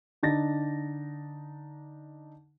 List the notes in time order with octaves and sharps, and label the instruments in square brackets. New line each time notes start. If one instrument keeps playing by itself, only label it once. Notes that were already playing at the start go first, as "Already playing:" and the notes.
[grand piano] D3 D4 D#4 A6 A#6